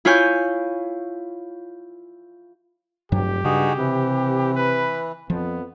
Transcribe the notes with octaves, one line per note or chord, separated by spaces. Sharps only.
E4 F4 C#5 G#5 G6
F1 G2 F#3 G4
G2 C#3 D#4 F#4 G#4
C3 E3
B4
F2 F3 B3